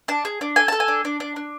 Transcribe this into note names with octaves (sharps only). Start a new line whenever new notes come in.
D4 A5
G#4
D4
A4 G#5
A4 A5
G#5
D4
D4
D4
D4